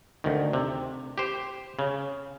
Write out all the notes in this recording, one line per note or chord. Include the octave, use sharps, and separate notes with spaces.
D2 D#3
C3
G4 C5
C#3